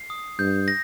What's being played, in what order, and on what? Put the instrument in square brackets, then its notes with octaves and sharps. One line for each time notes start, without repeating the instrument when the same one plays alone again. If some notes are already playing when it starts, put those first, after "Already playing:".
Already playing: [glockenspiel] C7
D#6
[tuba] G2 [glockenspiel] G6
[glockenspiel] A#6